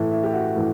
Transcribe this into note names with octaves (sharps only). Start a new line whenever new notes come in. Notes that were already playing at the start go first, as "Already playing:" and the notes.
Already playing: A2 E3 A3 E4
E4
G4
F#4
A2 E3